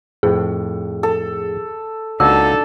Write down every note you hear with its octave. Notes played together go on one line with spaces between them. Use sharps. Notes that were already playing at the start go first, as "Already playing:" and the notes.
F2 A2 G#4
A4
C#2 A#3 D4 D#4 F#4 A4 E6